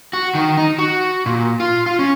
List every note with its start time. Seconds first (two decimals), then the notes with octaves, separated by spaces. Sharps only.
0.13 F#4
0.35 D#3
0.57 D#4
0.78 F#4
1.26 A#2
1.60 F4
1.86 F4
1.99 C#4